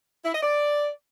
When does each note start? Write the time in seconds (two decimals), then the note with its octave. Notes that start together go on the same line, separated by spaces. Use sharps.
0.25 E4
0.34 D#5
0.43 D5